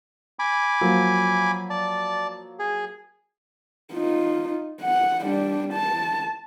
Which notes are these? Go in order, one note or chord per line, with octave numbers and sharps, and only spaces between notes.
G#5 B5 D6
F3 F#3 A#3
D5 A5
G#4
D#4 F4
F#5
G3 D4
A5